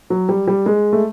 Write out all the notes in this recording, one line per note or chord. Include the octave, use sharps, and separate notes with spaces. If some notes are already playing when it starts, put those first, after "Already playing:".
F#3
G3
G3
G#3
A3